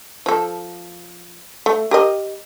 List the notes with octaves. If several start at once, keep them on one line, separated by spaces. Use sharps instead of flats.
F3 A4
A3
G4 A#4 D#5